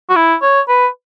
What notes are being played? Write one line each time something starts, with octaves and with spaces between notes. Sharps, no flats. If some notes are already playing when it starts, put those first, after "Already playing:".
F#4
E4
C#5
B4